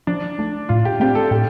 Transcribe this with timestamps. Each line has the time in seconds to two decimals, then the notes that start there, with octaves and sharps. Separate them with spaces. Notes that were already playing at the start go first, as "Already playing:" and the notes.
0.07 F3 D4
0.39 A3 D4
0.69 A2 F4
0.85 G4
1.00 A3 C4 G4
1.15 A4
1.31 A2 G4